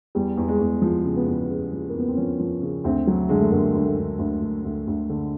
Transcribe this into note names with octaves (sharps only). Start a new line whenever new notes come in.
E2 G3
E2
G#3
E2
F3
C#3
B3
E2
C#3
F3
A#3
E2
B3
C4
F3 C#4
F3
C#3
D2 C4
F#3
D3 G#3
A3
D2 A#3
D2
A3
D2
D2
D2
D2
D2
D3